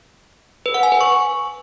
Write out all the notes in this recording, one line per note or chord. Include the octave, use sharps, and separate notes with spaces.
B4
F#5
G#5
B4
C#6